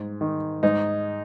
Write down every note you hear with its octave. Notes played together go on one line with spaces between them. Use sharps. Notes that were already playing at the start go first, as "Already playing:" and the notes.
Already playing: G#2
D#3
G#2 D#4